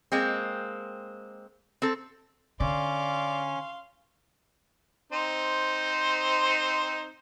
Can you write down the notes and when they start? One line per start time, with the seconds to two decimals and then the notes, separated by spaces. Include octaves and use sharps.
0.12 G#3 A#3 C4
1.82 C4 A4
2.60 D3 C#4 D5 F5 C6
5.13 C4 D#4 C5